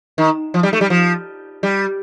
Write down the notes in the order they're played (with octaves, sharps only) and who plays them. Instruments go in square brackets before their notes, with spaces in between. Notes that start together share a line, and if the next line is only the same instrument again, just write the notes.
[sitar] D#3
F3
G3
A3
G3
F3
G3